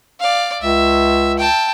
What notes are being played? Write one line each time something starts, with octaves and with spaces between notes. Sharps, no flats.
D5 F5
C#2 E5
G5 A5